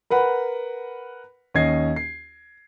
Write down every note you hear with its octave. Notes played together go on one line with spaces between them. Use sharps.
A#4 B4 F#5 B5
D#2 C#4 D#5 G#6 C7
C7